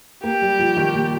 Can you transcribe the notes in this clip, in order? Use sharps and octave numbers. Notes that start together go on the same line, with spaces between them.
A#3 G4
G3
F3
D#3
A#2